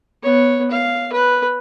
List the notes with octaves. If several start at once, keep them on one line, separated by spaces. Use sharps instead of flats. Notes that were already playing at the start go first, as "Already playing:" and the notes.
B3 C#5
F5
B4